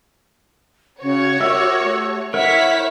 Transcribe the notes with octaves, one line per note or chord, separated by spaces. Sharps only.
C#3 F#4 C#5
G4 A#4 E5 E6
A3
E4 A#4 C#5 E5 F#5 B6